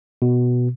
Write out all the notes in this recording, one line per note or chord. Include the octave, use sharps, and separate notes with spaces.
B2